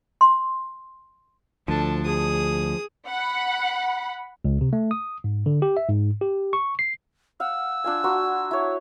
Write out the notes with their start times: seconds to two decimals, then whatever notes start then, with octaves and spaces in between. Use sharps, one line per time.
0.21 C6
1.68 D2 F3 D4 A4
2.06 G#4 D#6
3.08 F#5 B5
4.45 C#2
4.61 C3
4.73 A3
4.91 D#6
5.24 G#2
5.46 D3
5.62 G4
5.77 E5
5.89 G#2
6.21 G4
6.53 C#6
6.79 C7
7.40 F5 F#5 E6
7.84 D4 F4 G#5
8.04 F#4 A#5 C6
8.51 E4 C#5